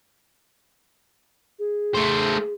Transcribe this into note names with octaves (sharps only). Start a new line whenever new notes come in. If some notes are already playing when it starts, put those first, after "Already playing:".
G#4
A3 C5